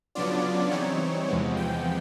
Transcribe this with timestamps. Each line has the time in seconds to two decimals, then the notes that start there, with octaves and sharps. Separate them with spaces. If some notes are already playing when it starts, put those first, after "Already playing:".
0.15 C#3 F#3 B3 D4 F4 D5
0.71 E3 G3 C4 D#4 C#5
1.28 E2 C3 F3 G#3 B3
1.57 G5